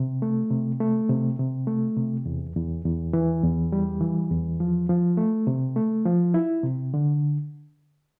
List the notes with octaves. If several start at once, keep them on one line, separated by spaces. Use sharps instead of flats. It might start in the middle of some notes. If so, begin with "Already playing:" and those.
Already playing: C3
A3
C3
A3
C3
C3
A3
C3
E2
E2
E2
E3
E2
G3
E3
E2
F3
F3
A3
C3
A3
F3
E4
C3
D3